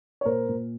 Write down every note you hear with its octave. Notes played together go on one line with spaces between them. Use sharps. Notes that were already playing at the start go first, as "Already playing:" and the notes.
C#5
A#2 A#4 C5
A#2